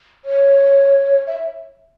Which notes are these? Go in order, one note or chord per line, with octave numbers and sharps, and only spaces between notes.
C#5
E5